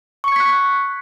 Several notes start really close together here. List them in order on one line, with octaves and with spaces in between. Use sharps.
C#6 C#7 G#6 B6 F#6